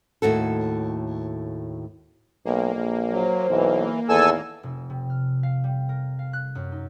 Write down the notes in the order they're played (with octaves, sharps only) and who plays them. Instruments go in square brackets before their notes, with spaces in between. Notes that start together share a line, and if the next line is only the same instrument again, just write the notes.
[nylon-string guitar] D#2 A2 F#4 A4
[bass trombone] B1 [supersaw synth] A#3
[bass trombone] A#1 [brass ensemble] A4
[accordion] F#3 [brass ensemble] C5
[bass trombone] B1 [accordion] E3
[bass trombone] E2 [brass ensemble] A2 D#3 [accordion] A4 G#5 E6
[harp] F1
C3
F6
F5
G3
A#4
F5
F#6
F#2
D#4